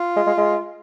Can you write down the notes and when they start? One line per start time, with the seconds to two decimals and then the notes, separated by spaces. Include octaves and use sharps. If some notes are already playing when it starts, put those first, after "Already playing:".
Already playing: F4
0.16 G#3
0.27 G#3
0.38 G#3